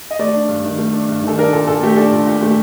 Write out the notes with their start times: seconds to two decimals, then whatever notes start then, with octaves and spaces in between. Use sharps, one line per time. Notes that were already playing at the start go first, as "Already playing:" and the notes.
0.11 D#5
0.19 A3 D5
0.34 D4
0.49 G2
0.64 D#3
0.78 A3
0.94 D4
1.08 G2
1.24 D#3 A4
1.38 D4 A#4
1.53 A#2 A4
1.67 A#2 A4
1.83 A3 G4
1.97 D4 A4
2.12 A#2
2.27 A#2
2.42 A3